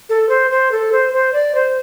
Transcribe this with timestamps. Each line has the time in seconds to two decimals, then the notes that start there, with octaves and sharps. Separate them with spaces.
0.09 A4
0.29 C5
0.51 C5
0.72 A4
0.92 C5
1.13 C5
1.33 D5
1.55 C5